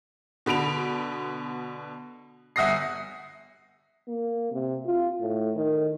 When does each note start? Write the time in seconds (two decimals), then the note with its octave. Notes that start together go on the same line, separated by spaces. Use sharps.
0.46 B2 D3 B5 D7 F7
2.56 G1 E5 F#5 D#6 A#6 C7
4.08 A#3
4.51 C3
4.86 F4
5.20 A2
5.56 D#3